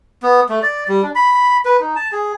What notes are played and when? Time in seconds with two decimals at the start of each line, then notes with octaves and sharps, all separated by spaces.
0.23 B3
0.49 A3
0.63 D5
0.88 G3
1.03 D4
1.15 B5
1.65 B4
1.80 D#4
1.96 A5
2.12 G#4